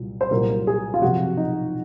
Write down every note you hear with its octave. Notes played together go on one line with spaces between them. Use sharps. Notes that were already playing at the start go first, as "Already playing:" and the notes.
Already playing: C2 A#2 F#3
C5
C2 A#2 F#3 A#4
G#4
F4
F2 C3 F#3 F#4
D#4